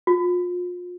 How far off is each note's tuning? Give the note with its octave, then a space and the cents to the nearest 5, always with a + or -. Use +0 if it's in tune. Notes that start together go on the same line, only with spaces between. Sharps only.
F4 +35